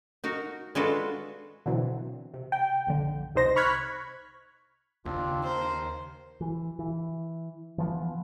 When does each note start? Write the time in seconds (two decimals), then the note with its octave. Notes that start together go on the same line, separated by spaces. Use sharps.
0.24 D#4 F#4 A#4
0.75 G#3 D4 F4 F#4 A4 B4
1.66 B2 D3 E3 F#3 C4
2.34 C3
2.52 G5
2.87 A#1 F2 D3
3.35 C2 C3 D#4 C5 A#6
3.56 B5 C#6 F6 F#6 G#6 B6
5.05 D#2 C#3 C4 D4 F4
5.44 A#4 C5
6.41 E3
6.79 E3
7.78 E3 F3 B3